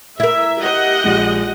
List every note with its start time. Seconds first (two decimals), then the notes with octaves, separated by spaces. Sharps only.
0.20 E4 A#4 E5
0.60 G4 D#5 F#5
1.04 A#1 G#3